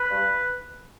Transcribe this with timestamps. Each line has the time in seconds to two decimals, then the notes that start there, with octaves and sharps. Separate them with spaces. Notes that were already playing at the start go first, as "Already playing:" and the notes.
Already playing: B4
0.11 G2